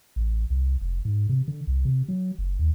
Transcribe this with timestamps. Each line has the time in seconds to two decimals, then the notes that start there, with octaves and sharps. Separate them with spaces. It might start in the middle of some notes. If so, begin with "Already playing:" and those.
0.16 A1
0.50 C2
0.81 F1
1.05 G#2
1.29 C3
1.48 D3
1.67 C2
1.85 C3
2.08 F#3
2.38 F#1
2.59 D#2